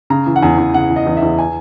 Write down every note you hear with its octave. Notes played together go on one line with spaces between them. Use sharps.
C#3 A#5
E3
F#5
E2 G#5
E2
C#3 F#5
E3
D#5
E2
E5
E2
G#5